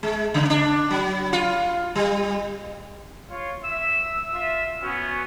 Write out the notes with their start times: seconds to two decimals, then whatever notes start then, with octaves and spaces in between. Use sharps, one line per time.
0.03 G#3
0.34 C#3
0.50 D4
0.91 F#3
1.33 F4
1.95 G3
3.30 F4 C#5
3.64 E5 E6
4.33 F4 E5
4.83 B3 C#4 F#4